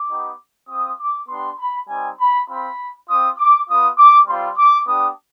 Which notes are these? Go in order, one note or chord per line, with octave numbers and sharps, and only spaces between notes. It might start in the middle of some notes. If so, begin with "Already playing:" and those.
Already playing: D6
B3 D#4 G4
C4 F4 D#6
D6
B3 D4 G4 C6
B5
G3 C4 D#4 G#5
B5
C4 F4 B5
C4 F4 D#6
D6
B3 F4 D#6
D6
G3 C4 F4 C6
D6
B3 D4 G4 D#6